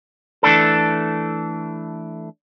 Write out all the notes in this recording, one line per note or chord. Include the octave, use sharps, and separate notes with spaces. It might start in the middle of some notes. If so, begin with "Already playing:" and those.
E3 A3 D4 A4